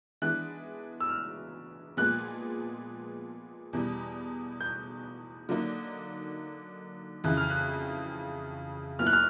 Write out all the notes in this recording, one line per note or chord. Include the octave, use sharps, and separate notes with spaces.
E3 G#3 B3 D4 F#6
E6
F6
A#2 F3 G#3 B3 F#6
E2 B2 G3
G6
D3 F#3 A#3 D#4
F2 C#3 E3 F#6
F6
F#6
A#2 F#3 B3 E4 F6
F#6
F6